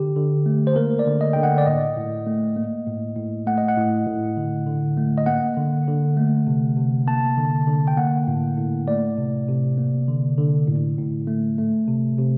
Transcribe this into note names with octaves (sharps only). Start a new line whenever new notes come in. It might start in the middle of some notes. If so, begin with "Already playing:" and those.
Already playing: D3 G4
D3
A3
C5
A#3 A#4
D5
D3
D#5
D3 G5
F#5
D5
A2 D#5
A2
A3
A#3
A2
A2
A3 F#5
D#5
F#5
A2
A2
D3
D3
A3
D#5
A#3 F#5
D3
D3
A3
C3
C3
A#3 A5
D3
D3
G5
A#3 F#5
A2
A2
A3 D5
C3
C3
A#3
D3
D3
A2
A2
A3
A3
C3
C3